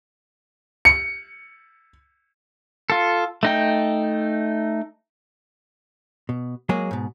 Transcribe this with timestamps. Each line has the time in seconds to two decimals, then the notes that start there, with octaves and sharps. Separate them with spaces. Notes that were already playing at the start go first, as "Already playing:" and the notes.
0.85 C#7
2.90 F4 A4
3.43 A3 D#4 G5
6.29 B2
6.69 F#3 G#3 A#3 G#4
6.91 G#2 B2